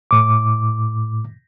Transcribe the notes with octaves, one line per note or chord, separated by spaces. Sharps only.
A2 D6